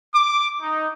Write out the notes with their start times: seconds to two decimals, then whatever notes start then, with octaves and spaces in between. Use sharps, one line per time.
0.15 D6
0.62 D#4